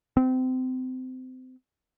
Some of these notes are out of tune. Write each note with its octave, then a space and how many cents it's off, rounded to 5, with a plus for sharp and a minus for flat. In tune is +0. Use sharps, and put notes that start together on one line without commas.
C4 -30